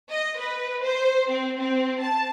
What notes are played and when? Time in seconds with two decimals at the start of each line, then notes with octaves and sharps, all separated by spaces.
0.10 D#5
0.38 B4
0.83 C5
1.29 C4
1.59 C4
2.00 A5